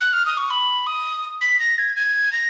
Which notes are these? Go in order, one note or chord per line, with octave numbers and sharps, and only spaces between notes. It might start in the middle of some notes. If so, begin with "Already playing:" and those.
F#6
F6
D#6
C#6
B5
D#6
B6
A#6
G#6
G#6
A#6